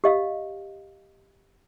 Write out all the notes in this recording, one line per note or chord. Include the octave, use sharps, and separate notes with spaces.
G4 D#5 F5